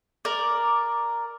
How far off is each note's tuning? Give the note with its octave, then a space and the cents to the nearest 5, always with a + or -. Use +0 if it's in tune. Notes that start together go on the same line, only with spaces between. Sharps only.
A#4 +0 D5 +0